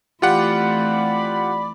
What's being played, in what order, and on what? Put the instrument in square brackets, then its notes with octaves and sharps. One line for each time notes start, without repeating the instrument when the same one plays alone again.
[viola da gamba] E3 A3 C4 [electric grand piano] F4 G4 F#5 [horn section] D5 B5